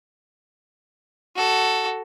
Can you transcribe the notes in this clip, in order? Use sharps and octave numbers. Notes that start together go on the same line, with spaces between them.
F#4 A4